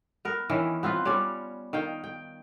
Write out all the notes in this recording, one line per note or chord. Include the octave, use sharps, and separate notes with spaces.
B3 A#4
D#3 E3 C#4 E4
B3 C4 F4 B4
G3 C#4 C#5 D5
D#3 F5 G5
G5